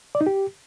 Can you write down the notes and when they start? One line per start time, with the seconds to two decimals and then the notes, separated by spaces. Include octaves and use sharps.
0.15 D5
0.21 D#4
0.27 G4